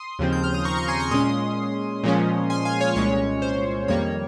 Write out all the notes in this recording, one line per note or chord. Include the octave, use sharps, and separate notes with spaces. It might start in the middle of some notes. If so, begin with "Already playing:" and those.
Already playing: C6 D#6
D#2 C#3 F3 C4
G6
F6
D#6
A#5 C#6
A#5 C#6
G#5 C6
A#5 C#6
A#2 G#3 C#4 C6 D#6
A#2 F3 G#3 C#4
G#5 C6
F5 G#5
C#5 F5
C2 A#2 G#3 C#4 C#5
C5
F2 D#3 G3 A#3 C#5